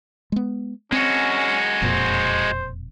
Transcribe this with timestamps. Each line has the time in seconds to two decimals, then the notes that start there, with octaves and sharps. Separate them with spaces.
0.32 G#3 B3
0.92 G#3 C4 C#4 F#4
1.82 E1 F2 A#2 C5